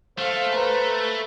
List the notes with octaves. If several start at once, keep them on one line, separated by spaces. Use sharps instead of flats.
A3 C5 F5
B4 A#5